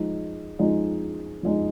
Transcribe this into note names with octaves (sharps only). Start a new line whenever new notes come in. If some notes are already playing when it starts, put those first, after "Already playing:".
Already playing: F3 G#3 D#4
F3 G#3 D#4
F3 G#3 D#4